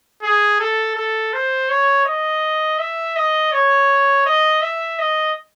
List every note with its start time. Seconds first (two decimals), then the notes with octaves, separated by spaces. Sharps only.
0.22 G#4
0.60 A4
0.95 A4
1.33 C5
1.69 C#5
2.05 D#5
2.78 E5
3.16 D#5
3.52 C#5
4.25 D#5
4.61 E5
4.99 D#5